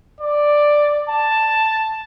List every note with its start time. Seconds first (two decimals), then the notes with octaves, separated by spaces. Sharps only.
0.20 D5
1.09 A5